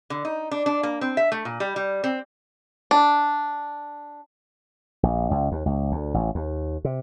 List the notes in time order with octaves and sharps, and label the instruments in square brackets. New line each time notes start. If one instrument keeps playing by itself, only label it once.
[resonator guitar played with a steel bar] D3
D#4
D4
D4
A#3
C4
E5
A3
A#2
G3
G3
C4
[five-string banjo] D4
[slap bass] A#1
C#2
D#2
C#2
D2
A1
D#2
C3